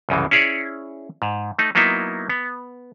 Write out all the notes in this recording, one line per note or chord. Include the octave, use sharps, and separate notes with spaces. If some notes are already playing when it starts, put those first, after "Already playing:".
C2 F#2 C#3 E3
C#4 E4 G#4 C#5 D5
G#2
A3 D#4
F#3 A#3 B3 D#4 E4
B3